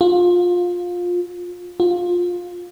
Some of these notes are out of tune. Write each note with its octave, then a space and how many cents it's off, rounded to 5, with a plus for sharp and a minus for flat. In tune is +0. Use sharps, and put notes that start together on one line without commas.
F4 +20
F4 +15